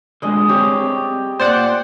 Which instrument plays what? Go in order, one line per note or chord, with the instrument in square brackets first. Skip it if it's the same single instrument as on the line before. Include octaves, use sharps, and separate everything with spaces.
[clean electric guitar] D3 G#3 [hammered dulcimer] G#4 D#5
[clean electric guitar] G3 C4 C#5 [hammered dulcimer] G4
[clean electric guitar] A#2 [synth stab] C5 D5 F#5